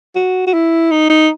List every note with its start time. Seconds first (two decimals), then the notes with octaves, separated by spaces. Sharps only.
0.16 F#4
0.47 F#4
0.54 E4
0.91 D#4
1.10 D#4